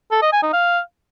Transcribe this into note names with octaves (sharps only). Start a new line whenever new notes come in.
A4
D#5
G#5
D#4
F5